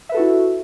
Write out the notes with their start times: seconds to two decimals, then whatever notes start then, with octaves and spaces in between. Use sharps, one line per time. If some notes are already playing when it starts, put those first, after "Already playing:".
0.09 E5
0.12 B4
0.14 A4
0.17 F#4
0.20 E4